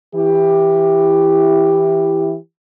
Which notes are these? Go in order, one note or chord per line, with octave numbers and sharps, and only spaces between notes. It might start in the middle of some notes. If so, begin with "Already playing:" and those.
E3 E4 G4